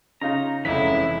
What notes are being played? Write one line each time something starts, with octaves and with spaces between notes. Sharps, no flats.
C#3 D#4 F4 A#5
F1 E3 G#3 C#4 E4 B6